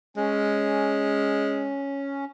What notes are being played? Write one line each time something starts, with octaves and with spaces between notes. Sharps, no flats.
G#3 C#4